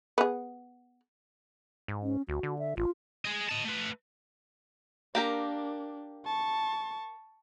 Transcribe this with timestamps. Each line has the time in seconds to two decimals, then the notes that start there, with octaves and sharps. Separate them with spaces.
0.18 B3 G#4
1.88 G#2
2.03 C#4
2.29 D2 F#4
2.43 D3
2.59 E5
2.77 A1 F4
3.25 G#4 D#5
3.49 D#5 A5
3.65 A3 B4
5.15 A#3 D4 G4 A#4
6.26 A5 C#6